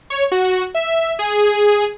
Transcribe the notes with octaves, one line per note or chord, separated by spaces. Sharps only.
C#5
F#4
E5
G#4